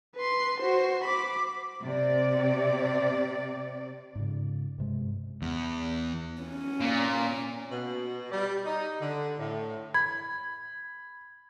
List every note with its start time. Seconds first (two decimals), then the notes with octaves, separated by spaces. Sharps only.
0.16 B4 C6
0.60 F#4 C5
1.04 B5 D6
1.84 C3 D5
4.15 G#2 C#3
4.78 G2 C3 G#3
5.42 E2
6.42 C#4
6.80 A#2
7.70 B2
8.31 G3
8.66 D#4
9.01 D3
9.38 A2
9.94 B5 G#6